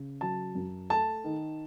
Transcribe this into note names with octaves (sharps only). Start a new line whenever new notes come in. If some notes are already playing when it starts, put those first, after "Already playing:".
Already playing: C#3
F#3 A5
F#2
A3 A5
D#3